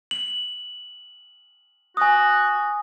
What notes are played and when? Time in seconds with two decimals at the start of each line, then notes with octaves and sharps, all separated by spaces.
0.11 F#7
1.97 F#4 G#5 D#6